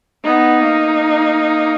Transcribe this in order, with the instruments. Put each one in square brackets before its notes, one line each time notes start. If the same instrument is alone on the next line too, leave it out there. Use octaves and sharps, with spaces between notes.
[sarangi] B3 [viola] D#4
[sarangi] A#3